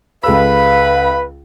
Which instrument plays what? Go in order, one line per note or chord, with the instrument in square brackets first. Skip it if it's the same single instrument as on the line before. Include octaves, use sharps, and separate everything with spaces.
[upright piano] C#2 A4 E6 [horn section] B4 [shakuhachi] F5 [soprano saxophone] B5